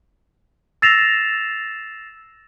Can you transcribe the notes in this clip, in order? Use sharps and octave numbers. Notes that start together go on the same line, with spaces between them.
E6 A6 A#6 C7 E7 F7